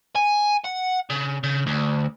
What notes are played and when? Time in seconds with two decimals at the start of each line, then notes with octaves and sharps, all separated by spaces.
0.16 G#5
0.65 F#5
1.10 C#3
1.43 C#3
1.67 D2